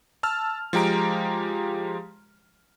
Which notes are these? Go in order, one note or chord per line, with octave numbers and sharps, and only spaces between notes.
A5 E6 F6
F3 G#3 G4 A#5 D7